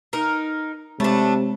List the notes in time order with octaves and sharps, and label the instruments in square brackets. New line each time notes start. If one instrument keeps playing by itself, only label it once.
[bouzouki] D#4 A#4
[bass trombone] C3 [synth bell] G#3 [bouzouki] A3 D4